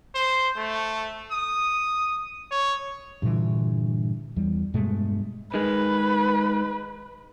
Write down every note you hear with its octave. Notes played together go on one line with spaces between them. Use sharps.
C5
A3
D#6
C#5
G2 A#2 D3 E3
E2 G3
G2 B2 G#3 A3
D#3 G#3 B4